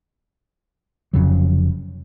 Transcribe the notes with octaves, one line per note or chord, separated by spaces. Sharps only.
F1 F2 C#3 F#3